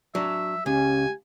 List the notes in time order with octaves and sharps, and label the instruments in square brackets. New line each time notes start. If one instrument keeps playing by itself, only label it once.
[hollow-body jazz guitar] F#3 D4 [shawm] E5
[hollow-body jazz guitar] C#2 [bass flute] C#4 [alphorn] G4 [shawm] G#5